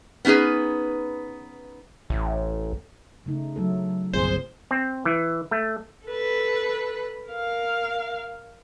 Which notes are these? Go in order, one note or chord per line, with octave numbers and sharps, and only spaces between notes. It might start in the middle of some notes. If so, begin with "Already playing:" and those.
B3 C#4 D#4 G#4 B4
A1
C#3 A3 D#4
F#3 A3 A4
G1 C2 A#2 C4 F4 G#4 C5
C4
E3
A3
A4 B4
A#4 F5